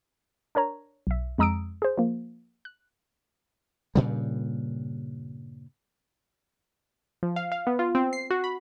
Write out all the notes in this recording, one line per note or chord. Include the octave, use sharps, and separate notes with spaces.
D4 A#4 C#5 A#5
B1 E5
F2 G#3 A#5 D#6 E6 D7
G#4 C5
F3 A#3
F#6
G2 A#2 C#3 G3
F3
F5
F5
B3
F4
C4
C7
F#4
B5